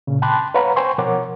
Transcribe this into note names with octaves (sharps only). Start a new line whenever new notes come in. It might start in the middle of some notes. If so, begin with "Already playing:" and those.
A#2 C#3
G5 A5 B5 C6 D6 F#6
B4 C#5 F5 F#5 A#5 B5
C5 G5 G#5 C6 C#6
B2 F3 A#4 C#5 F#5 D6